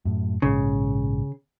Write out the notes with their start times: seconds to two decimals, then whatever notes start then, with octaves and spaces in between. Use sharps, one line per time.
0.05 F#2 A2
0.42 A#1 G#2 C#3